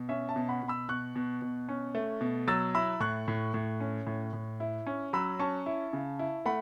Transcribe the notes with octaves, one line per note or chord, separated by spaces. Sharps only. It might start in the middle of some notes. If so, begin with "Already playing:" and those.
Already playing: B2
C#4 E5
E5 A5
B2
F#5 B5
B2
B5 E6
B2 C#6 F#6
B2
B2
C#4
A3
B2
F#3 E6 A6
E4 B5 E6
A2 C#6 F#6
A2
A2
C#4
A2
A2
E4
C#4
F#3 B5 E6
C#4 A5 C#6
E4
C#3
E4
A3 F#5 B5